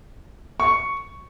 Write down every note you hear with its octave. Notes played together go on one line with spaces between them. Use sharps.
C#6